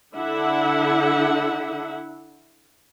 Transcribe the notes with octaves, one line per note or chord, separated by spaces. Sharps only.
D3 D4 E4 E5 F#5